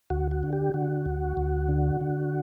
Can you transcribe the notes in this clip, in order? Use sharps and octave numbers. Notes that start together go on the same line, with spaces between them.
D2 F#4
F#4
D3
G4
D3 F#4
D2
D2
D3
D3